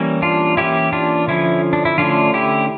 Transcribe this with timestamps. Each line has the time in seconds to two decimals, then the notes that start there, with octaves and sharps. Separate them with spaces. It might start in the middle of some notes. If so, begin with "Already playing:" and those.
Already playing: E3 G3 A#3 C#4
0.22 D4 F4
0.57 E3 A#3 C#4 E4 G4
0.93 D4 F4
1.28 D3 F3 C#4 E4
1.73 D4
1.85 E4
1.98 D3 A3 C#4 D4 F4
2.34 E4 G4